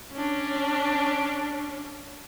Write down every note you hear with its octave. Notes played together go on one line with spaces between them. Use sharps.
C#4 D4